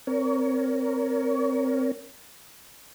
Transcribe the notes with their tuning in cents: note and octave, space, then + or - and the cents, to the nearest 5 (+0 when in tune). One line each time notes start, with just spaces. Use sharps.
C4 +0 A#4 +5 C#5 +35